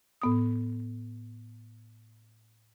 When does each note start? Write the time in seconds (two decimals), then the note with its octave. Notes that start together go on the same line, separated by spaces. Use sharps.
0.22 A2 B3 D#6